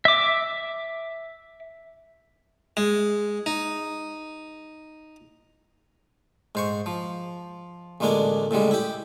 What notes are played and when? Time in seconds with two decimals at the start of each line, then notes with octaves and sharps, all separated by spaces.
0.05 E5 D6
2.77 G#3
3.46 D#4
6.55 G#2 C5 C#6
6.86 F3
8.00 A1 D2 G#3 A#3 D4 G#5
8.51 A2 C#3 G3 G#3
8.71 E4 G4